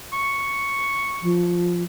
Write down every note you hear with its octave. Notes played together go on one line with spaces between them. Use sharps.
C#6
F3